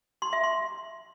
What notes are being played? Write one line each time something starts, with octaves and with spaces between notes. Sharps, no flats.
C6
E5
C6